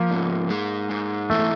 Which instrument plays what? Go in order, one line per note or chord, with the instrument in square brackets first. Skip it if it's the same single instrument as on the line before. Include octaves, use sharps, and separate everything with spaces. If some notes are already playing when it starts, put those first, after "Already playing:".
Already playing: [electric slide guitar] F3 [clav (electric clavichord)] A#3
[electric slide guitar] G#2
G#3
G#2
[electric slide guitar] E3 [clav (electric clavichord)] A3